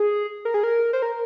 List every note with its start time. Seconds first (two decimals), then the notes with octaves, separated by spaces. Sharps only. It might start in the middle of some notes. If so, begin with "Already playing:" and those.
Already playing: G#4
0.45 A#4
0.54 G#4
0.63 A#4
0.93 C5
1.02 A#4